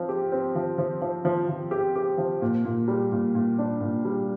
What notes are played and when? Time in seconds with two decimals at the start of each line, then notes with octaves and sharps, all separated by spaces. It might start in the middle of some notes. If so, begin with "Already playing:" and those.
Already playing: F3 C4
0.09 G4
0.32 C4
0.55 F3
0.78 F3
1.02 F3
1.25 F3
1.49 F3
1.71 G4
1.96 G4
2.18 F3
2.42 A#2
2.65 A#2
2.88 G3
3.12 A#2
3.35 A#2
3.58 D4
3.81 A#2
4.05 G3